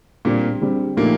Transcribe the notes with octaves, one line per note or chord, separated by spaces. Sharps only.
A#2 D3 G3 A#3 C4
D3 G3 C4
A#2 F3 A3 A#3 D#4 G4